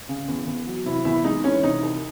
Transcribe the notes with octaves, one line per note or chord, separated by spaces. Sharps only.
C#3
E2
E2
F#3
C3 E4
E2 E4
G#3 D#4
E3 C#4
C3 D#4
C2